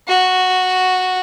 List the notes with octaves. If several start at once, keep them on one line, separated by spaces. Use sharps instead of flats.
F#4